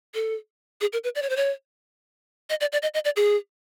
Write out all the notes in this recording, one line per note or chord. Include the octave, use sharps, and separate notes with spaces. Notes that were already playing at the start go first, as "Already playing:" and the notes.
A4
G#4
A#4
B4
D5
C#5
C5
C#5
D#5
D5
D5
D#5
D#5
D5
G#4